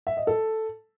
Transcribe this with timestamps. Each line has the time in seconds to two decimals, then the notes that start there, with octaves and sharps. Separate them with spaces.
0.07 E5
0.17 D#5
0.27 A4